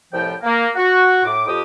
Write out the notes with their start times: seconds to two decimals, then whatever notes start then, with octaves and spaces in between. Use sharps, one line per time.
0.13 C2 A2 F3 G5
0.43 A#3
0.75 F#4
1.25 A2 D6
1.47 F2 G4 D#6